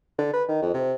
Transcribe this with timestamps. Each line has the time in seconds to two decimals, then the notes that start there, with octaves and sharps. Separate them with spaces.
0.19 D3
0.33 B4
0.49 D#3
0.62 F2
0.74 C3